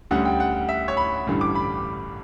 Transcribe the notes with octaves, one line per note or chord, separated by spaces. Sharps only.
D2 D3 G3 C#4 F#5
G5
F#5
E5
C#5
B5
A1 G2 D3 G3 C#4
D6
B5